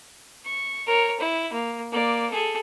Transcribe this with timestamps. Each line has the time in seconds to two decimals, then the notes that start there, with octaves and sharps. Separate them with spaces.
0.45 C#6
0.87 A#4 C#5
1.20 E4
1.53 A#3
1.92 A#3 D5
2.30 G#4 A4